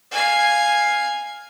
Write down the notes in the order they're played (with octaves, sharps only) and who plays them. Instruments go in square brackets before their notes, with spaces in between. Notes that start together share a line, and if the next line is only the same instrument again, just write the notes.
[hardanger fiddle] F5 G#5